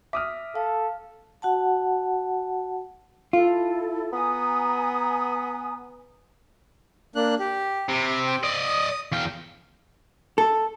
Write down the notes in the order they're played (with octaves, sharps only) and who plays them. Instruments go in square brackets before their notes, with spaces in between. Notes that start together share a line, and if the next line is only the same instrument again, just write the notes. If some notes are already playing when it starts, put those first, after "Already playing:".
[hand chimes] E5 B6 [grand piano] D6 D#6 F6
[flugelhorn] A4 [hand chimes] F5
[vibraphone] F#4 F#5 A5
[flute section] E4 A4 [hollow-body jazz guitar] F4
[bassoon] B3 [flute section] G#5 A#5 D#6
[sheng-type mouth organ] A#3 D4 F#6
G4
[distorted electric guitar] C3 [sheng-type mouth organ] B5
[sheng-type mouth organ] G5
[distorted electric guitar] D5 D#5 [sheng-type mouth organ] D#6
[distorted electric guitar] E2 G5 [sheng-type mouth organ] F5
[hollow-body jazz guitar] A4